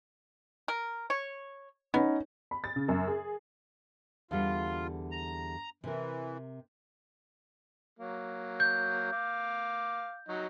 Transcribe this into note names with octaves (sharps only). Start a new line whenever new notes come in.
A#4
C#5
B3 C#4 D#4
B5
A6
C#3
F#2
G#4
E2 D3 G3 F4
A#5
C3 E3 A#4
F#3 A#3
G6
F5 D6
F#3 D#4 F#4